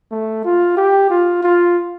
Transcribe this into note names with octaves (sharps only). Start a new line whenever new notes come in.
A3
F4
G4
F4
F4